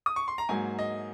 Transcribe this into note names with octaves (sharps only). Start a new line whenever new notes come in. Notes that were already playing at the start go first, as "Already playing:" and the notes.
D#6
C#6
C6
A#5
G#2 F#3 A#3 G#5
D#5